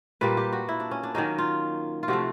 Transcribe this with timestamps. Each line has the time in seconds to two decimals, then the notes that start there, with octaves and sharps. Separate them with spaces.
0.21 A#2 G3 A#3 B4
0.37 G4
0.53 F#4
0.69 E4
0.80 D4
0.91 C#4
1.03 D4
1.15 D#3 F#3 A#3 C#4 D#4
1.38 F4
2.03 F4
2.08 C3 F3 A3 F#4